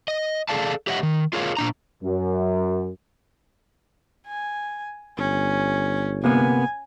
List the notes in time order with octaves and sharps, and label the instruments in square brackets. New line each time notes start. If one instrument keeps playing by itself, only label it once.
[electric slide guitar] D#5
G#4 A4 D5 F5 A5
G4 C#5 D#5 E5 F#5
D#3
F4 G#4 A#4 C#5 E5 F5
A#2 D4 A#5
[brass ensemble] F#2
[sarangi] G#5
[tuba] G1 [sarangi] C#4
[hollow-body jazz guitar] C3 A#3 B3 [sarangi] G#5